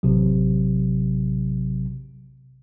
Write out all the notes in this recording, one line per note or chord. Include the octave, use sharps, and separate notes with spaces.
A1 C3 F#3